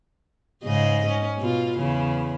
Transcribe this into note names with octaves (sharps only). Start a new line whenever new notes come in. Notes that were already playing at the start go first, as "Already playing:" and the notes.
G#2 C#3 D#5
C#4
B2 F4
E2 C#3